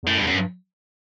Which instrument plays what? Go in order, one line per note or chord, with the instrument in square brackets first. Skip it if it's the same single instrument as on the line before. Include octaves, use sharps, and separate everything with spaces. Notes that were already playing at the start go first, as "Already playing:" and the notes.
[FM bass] E2
[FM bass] F#2 [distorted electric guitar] A2
[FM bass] E2 [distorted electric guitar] G2
[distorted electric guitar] F#2
[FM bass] G2